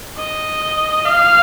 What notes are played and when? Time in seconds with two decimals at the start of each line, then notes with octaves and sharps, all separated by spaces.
0.18 D#5
1.05 F5